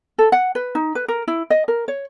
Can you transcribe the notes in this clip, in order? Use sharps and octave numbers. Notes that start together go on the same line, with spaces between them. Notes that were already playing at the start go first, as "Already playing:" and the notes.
A4
F#5
B4
D#4
B4
A#4
E4
D#5
A#4
C#5